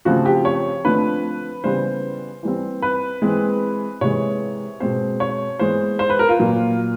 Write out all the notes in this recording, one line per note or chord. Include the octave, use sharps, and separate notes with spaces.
C#3 F3 A3 C4 F#4
G4
C#5
D3 F3 A3 C4 B4
C#3 E3 G3 B3 C5
E3 G3 C4
B4
E3 G#3 C4
C3 E3 G#3 C#5
B2 G#3 C4 C5
C#5
E3 G#3 B3 C5
C5
B4
A#4
F4
A#2 F#3 A#3